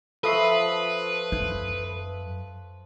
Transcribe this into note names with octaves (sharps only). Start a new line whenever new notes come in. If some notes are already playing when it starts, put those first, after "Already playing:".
F3 A4 B4 E5 C#6 D#6 C7
F#2